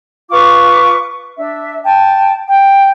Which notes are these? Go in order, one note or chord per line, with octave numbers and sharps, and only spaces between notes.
F4 B4 C#6 D6
D4 E5
G5 A5
G5